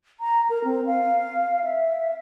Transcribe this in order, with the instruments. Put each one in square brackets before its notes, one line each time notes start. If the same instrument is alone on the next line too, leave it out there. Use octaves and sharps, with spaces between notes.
[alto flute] A#5
A#4
C4
F5
E5